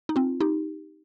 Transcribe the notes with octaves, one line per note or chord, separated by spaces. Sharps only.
D#4
C4 F4
D#4 G4